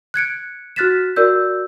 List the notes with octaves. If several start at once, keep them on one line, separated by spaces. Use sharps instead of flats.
F#6 G#6 C#7 D7
F#4 F6 F#6 A6 B6 E7
F#4 A#4 D5 E6 G6